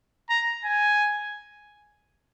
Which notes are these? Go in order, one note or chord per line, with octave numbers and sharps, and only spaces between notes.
A#5
G#5